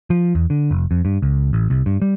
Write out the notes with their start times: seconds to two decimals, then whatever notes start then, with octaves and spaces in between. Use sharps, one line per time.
0.10 F3
0.35 E2
0.50 D3
0.71 F1
0.91 F2
1.05 G2
1.22 C#2
1.53 A1
1.70 C2
1.86 G2
2.02 G3